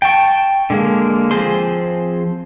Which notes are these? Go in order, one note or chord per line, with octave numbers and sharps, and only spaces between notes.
G5 A5 C#6
D3 G#3 A#3
F3 C4 G#4 C5 C6